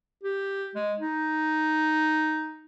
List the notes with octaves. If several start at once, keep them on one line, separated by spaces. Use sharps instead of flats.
G4
G#3
D#4